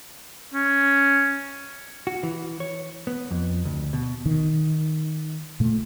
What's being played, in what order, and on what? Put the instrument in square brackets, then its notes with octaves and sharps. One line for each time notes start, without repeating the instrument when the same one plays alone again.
[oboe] C#4
[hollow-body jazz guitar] F#4
E3
C#5
B3
F2
D2
B2
[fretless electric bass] D#3
A#2 A3